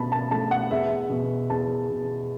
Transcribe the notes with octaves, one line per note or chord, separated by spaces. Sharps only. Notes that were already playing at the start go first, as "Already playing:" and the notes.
Already playing: B2 A3 A5 B5
A5
A3 A5
F#5
E2 E5
B2 B3
E2 A5
B2 B3